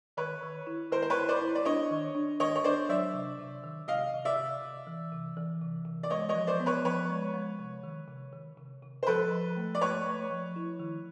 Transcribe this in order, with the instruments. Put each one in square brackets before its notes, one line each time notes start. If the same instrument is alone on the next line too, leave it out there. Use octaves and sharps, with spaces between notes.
[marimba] D#3 [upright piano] B4 C#5
[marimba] D#3
E4
[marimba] D#3 [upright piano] A#4 C5
[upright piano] C5
B4 C#5
[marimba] E4
[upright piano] C5 D5
[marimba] E4
[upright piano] D5
[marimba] D4 [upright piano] C#5 D#5
[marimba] D#3
D4
[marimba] D#3 [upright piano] C#5 D#5
[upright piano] C#5
[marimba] D4 [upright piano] C5 D5
[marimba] F#3 [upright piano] D5 E5
[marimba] C3
C3
D#3
[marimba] C3 [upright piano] D#5 F5
[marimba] C3
[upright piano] D5 E5
[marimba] C3
C3
E3
C3
E3
C3
C3
[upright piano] D5
[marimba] G#3 [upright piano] C#5 D#5
[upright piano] C#5 D#5
[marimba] F3
[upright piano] C5 D5
[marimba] B3
[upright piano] B4 C#5
[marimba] F3 [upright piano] B4 C#5
[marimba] G#3
G#3
C3
D#3
C3
D#3
C3
C3
[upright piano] C5
[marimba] F3 [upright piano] A4 B4
[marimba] F3
A3
[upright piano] D5
[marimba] A3 [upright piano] B4 C#5
[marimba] A3
F3
E4
D#3